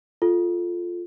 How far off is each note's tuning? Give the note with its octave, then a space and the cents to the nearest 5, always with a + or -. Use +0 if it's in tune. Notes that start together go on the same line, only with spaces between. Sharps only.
F4 +0 A4 -10